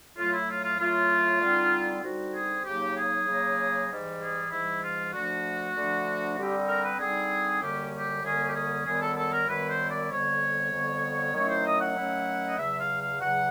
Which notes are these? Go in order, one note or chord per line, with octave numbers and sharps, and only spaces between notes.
A2 F#3 A3 F4
E4
F4
F4
A2 F#3 A3 F4
D3 G3 C4 D#4
D3 G3 C4 D#4 F#4
G#4
C#3 F#3 A#3 D#4 G4
G#4
C#3 F#3 A#3 D#4
G#2 E3 G3
G#4
G#2 E3 G3 E4
F4
D3 F3 A3 D4 F#4
D3 F3 A3 D4
D3 G3 C4 D#4 G4
A#4
B4
D3 G3 C4 D#4 G#4
F#2 D3 G3 A#3 C#4 G4
G4
F#2 D3 G3 A#3 C#4 G#4
G4
G#4
F#2 D#3 G3 B3 E4 G#4
A4
A4
A#4
F#2 D#3 G3 B3 E4 B4
C5
D5
F2 D3 G3 B3 C#5
F2 D3 G3 B3
D#3 F#3 A3 C#4 E4 C#5
C5
D#5
F#5
D#3 F#3 A3 C#4 E4
D#5
E2 C#3 F#3 E5
F5
F5
E2 C#3 F#3 F#5